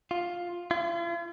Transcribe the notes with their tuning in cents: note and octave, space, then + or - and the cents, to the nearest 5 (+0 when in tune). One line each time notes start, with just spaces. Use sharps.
F4 +10
F4 -45